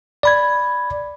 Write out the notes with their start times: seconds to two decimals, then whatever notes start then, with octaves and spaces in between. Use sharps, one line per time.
0.23 D5 B5 G#6